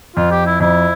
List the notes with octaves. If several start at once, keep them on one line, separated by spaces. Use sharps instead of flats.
F2 F4
G4
E4
F2 E4